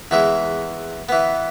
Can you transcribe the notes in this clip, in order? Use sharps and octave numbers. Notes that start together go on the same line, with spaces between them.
E2 E3 G#3 E5
E3 B3